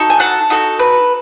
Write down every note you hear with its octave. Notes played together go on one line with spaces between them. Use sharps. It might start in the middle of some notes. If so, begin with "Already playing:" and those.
Already playing: D#4 F#4 A4
G#5
F#5 A5
D#4 F#4 A4
B4